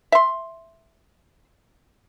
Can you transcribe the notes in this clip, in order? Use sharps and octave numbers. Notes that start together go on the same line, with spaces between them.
E5 C6